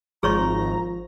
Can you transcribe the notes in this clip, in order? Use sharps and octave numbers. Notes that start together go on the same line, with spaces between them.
G#1 F3 G#4 C#5 A#5 C#6